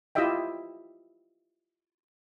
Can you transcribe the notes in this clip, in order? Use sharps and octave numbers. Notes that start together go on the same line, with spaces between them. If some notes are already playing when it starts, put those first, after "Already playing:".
E4 F4 G4 D#5 E5 G5